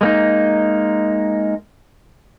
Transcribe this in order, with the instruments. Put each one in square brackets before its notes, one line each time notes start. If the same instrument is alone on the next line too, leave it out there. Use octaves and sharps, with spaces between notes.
[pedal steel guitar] G#3 A#3 D#4